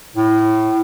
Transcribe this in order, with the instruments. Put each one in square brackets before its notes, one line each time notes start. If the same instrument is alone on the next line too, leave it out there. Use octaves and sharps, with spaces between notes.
[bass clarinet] A2